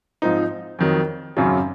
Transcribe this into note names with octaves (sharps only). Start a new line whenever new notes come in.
G#2 F3 C4 D#4
F2 D#3 F#3
G#1 F#2 C#3 F#3 C#4